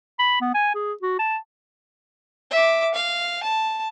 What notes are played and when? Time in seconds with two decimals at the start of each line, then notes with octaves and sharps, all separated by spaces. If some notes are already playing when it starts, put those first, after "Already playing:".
0.19 B5
0.41 B3
0.55 G#5
0.75 G#4
1.02 F#4
1.19 A5
2.51 E5 D6
2.94 F5
3.43 A5